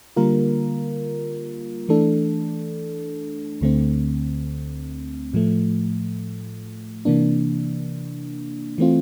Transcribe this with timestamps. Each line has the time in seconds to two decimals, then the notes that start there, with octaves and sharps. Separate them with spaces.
0.16 D3 G3 A#3 F4 A#4
1.89 E3 A3 D4 A4
3.61 D2 D3 A3 C4
5.33 A2 F3 A3
7.05 C3 E3 A#3 D4
8.78 E3 A3 C4 F4